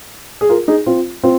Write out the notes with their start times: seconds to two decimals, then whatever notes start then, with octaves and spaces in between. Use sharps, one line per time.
0.41 G#4
0.49 F4 A#4
0.68 D#4 G#4
0.86 C4 F4
1.23 C4 F4